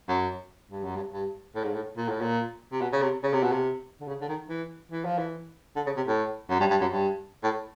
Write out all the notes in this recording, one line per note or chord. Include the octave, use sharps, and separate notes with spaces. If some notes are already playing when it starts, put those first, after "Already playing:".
F#2
G2
F#2
G2
G2
A2
G#2
A2
A#2
A2
A#2
C3
B2
C#3
C3
C#3
C3
B2
C3
D3
C#3
D3
D#3
E3
E3
F3
E3
D3
C#3
C3
A2
F#2
G2
G2
F#2
G2
A2